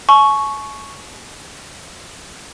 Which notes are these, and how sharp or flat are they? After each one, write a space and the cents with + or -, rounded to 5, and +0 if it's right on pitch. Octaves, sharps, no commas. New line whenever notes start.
G#5 +45 C#6 +0